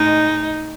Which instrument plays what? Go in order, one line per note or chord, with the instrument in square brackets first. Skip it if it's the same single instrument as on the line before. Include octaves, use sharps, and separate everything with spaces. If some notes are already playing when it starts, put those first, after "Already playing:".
Already playing: [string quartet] A2 G#3 D#4